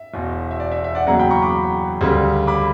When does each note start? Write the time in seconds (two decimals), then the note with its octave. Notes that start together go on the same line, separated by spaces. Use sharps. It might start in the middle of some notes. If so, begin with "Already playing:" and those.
Already playing: E5
0.14 E1 E2 B2
0.51 E5
0.60 D5
0.72 E5
0.84 E5
0.95 D5 F#5
1.07 E2 C#3 F#3 A#3 F#5 A#5
1.19 G5 B5
1.31 A#5 C#6
1.42 B5 D6
2.01 D2 C#3 G3
2.47 B5 D6